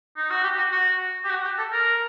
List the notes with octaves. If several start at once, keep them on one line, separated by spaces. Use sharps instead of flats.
D#4
F#4
G4
F#4
F#4
G4
F#4
G4
A4
A#4